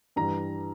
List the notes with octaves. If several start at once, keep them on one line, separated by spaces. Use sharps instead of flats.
G2 E3 G3 A#5